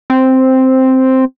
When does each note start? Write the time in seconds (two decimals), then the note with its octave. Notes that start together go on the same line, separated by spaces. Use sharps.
0.10 C4